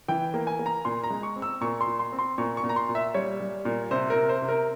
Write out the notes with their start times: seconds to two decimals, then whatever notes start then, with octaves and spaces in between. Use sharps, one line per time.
0.08 E3 G5
0.34 A#3
0.47 G#5
0.59 A#3
0.66 A#5
0.85 A#2 C6
1.04 A#5
1.10 G#3
1.23 C#6
1.36 C4
1.42 E6
1.61 A#2 C#6
1.81 C6
1.87 A#2
1.99 C6
2.12 C4
2.19 C6
2.38 A#2 C#6
2.57 C#6
2.64 A#2
2.69 A#5
2.76 C6
2.89 A#2
2.95 E5
3.14 G3 C#5
3.40 G3
3.65 A#2
3.91 C3 C5
4.10 A#4
4.16 C3
4.29 C5
4.42 C3
4.49 A#4